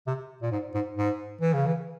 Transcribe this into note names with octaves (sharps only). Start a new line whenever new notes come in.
C3
A#2
G#2
G#2
G#2
E3
C#3
E3